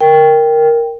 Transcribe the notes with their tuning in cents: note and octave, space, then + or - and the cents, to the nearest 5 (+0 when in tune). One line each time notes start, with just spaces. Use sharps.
A#4 +0 G5 +5